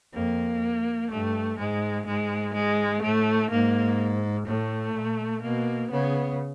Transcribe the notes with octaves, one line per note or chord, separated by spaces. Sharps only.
F2 A#3
G2 A3
G#2 G#3
G#2 G#3
G#3
A2 A3
G#2 A#3
A2 A3
A#2
B2 A#3
C#3 B3